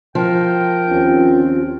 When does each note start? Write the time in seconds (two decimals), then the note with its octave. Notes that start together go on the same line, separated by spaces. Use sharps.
0.15 F3 A#4 G5
0.89 D#2 C4 C#4 F4